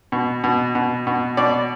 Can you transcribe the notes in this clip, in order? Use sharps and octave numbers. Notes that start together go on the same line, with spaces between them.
B2
B2
B2
B2
B2 D5